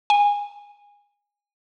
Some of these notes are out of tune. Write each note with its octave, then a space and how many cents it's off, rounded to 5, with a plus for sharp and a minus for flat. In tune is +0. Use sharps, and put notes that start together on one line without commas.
G#5 -20